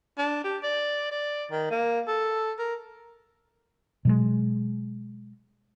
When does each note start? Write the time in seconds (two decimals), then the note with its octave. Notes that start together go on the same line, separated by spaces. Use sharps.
0.18 D4
0.44 G4
0.63 D5
1.11 D5
1.51 D#3
1.71 A#3
2.08 A4
2.59 A#4
4.05 B2 F#3 G#3